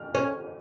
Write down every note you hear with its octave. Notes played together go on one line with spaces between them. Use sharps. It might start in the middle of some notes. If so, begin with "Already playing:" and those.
Already playing: F6
C#4